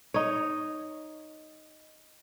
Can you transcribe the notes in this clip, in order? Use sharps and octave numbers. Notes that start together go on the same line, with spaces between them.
D#4 C#5